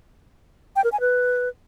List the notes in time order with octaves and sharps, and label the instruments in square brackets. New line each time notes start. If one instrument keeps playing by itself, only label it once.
[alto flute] G5
A#4
G#5
B4